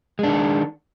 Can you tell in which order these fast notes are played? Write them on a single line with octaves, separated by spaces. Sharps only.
G#3 D4 D#3